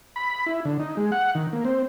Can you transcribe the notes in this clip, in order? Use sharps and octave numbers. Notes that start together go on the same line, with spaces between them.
B5
E4
D3
D#4
G#3
F#5
D#3
A#3
C4